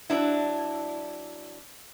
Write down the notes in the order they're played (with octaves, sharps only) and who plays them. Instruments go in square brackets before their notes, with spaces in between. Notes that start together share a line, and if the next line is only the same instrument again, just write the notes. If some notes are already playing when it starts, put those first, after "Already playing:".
[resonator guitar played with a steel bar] F#3 D4 E4